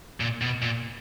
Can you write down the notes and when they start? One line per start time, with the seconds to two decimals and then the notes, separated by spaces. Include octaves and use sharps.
0.20 A#2
0.42 B2
0.62 A#2